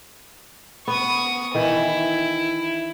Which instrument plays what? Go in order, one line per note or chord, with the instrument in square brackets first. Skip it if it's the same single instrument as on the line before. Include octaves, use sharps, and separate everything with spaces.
[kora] B3 [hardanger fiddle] C#6 D#6
[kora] D#3 E3 [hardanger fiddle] E4